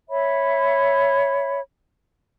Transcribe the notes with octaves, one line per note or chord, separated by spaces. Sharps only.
C#5 E5 B5